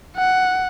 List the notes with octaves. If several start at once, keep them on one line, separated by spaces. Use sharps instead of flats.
F#5